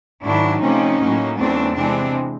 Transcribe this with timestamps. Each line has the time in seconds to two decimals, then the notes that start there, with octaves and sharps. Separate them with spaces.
0.23 G#2 D#3 F#3 D4 E4
0.61 C3 F3 A3 C#4 D#4
0.99 A2 F#3 A#3
1.38 E2 C#3 F#3 A3 C4 D4
1.75 C3 E3 G#3 C4 D4